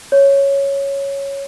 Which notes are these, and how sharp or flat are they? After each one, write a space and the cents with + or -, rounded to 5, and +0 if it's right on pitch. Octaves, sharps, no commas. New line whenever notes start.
C#5 +0